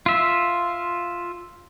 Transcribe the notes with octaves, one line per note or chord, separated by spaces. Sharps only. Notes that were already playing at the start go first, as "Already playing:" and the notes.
F4 E5